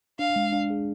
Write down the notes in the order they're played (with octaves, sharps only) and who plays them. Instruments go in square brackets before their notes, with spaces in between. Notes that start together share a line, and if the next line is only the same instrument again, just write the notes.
[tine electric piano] D4 [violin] F5
[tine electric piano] G#3
D4
G#4